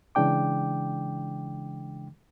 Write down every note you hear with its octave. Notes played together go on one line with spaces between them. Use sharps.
C#3 E3 G#3 D4 G5 D6